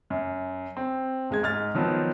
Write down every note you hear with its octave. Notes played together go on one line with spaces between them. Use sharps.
F#2
C4
D#1 G#3 G#6
G#2 F6 A6
D#3 F3 F#3 B3